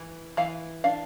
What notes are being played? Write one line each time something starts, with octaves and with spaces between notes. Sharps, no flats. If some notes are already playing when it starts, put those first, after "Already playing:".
Already playing: E3
E3 F5
D4 F5